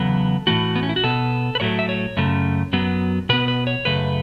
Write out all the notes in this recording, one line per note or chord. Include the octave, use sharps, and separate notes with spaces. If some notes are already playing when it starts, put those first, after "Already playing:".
Already playing: E2 C#3 F#3 B3 A4
A2 E3 A3 F#4
B3
C#4
E4
F#4
B2 B3 A4
B4
A2 F#3 A3 C#5
E5
C#5
F#2 C#3 A3
F#2 F#3 B3
B2 B3 B4
B4
C#5
F#2 C#3 A3 B4